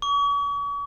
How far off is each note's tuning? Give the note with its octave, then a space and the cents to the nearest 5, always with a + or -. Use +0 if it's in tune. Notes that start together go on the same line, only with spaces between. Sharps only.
C#6 +45